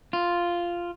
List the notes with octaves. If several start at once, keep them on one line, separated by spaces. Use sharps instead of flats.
F4